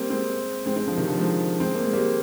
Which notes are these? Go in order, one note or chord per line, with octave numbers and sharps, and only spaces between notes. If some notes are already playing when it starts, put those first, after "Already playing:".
Already playing: G3 A#3 C4
G#3 C4
G#3 C4
G#3 C4
D3 F3
C3 D#3
D3 F3
F3 G#3
G#3 C4
A#3
G#3
G3 A#3